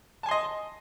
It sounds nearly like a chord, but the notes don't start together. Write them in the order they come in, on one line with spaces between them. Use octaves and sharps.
A5 G#5 C6 D#5